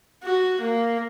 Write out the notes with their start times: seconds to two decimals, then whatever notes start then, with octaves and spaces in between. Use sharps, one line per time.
0.23 F#4
0.61 A#3